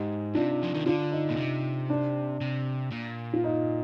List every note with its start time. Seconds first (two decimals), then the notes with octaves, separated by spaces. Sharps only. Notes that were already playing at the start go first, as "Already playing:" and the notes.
Already playing: G#2 D#4 G4
0.35 C3 D4 F4
0.63 F3
0.75 D#3
0.86 D3 D4 F4
1.12 D#4
1.30 A#2
1.37 C3
1.90 D4
2.41 C3
2.91 A#2
3.33 F4
3.44 D#4